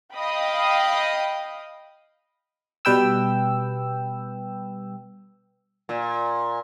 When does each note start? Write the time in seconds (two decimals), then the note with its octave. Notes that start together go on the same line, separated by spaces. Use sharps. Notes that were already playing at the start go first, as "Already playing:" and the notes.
0.13 D#5 F5 G5 B5 D#6
2.85 B2 G3 B4 G5 E6
5.89 A#2